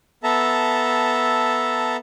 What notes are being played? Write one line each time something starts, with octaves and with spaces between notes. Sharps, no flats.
B3 A4 E5 A5 A#5